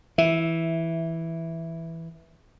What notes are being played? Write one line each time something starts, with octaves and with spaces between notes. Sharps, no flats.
E3 E5